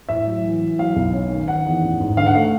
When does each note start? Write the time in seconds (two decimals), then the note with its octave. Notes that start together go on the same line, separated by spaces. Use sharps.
0.09 A2 E5
0.27 F#3
0.43 E3
0.61 E3
0.79 F#3 F5
0.96 B1
1.13 C#4
1.30 D#3
1.47 D#3 F#5
1.66 E2
1.83 A1
2.00 G#2
2.17 D3 F5
2.26 F#5
2.35 A3 F5